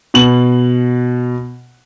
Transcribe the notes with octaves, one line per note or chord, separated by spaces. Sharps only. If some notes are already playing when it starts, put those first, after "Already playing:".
B2 F#7